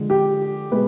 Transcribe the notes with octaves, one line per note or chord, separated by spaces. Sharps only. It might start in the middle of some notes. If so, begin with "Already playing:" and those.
Already playing: D3 F3 G#3
G4
B2 G#3 B4